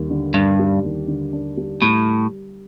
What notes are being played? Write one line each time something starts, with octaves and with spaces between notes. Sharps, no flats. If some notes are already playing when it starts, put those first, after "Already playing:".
Already playing: D#2 G3
D3
G2 D4
G3
D#2
D3
D4
G3
A2 G3